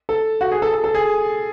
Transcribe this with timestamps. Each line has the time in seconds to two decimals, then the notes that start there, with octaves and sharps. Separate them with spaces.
0.09 A4
0.41 F#4
0.52 G#4
0.62 A4
0.73 A4
0.84 A4
0.94 G#4